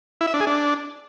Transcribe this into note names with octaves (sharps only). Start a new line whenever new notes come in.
E4
E5
D4
G#4
D4